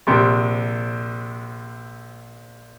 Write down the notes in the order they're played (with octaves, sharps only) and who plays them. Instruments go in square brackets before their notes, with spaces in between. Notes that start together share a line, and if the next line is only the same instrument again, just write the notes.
[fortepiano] A#1 C3